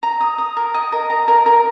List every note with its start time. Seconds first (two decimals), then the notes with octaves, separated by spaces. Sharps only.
0.03 A#5
0.21 D#6
0.38 D#6
0.57 A#4
0.74 D#5
0.92 A#4
1.10 A#5
1.28 A#4
1.46 A#4